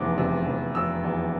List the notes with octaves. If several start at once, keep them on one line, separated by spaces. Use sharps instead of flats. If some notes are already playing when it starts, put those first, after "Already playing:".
Already playing: F1 E2 D6
C3
F1
F1 E6
E2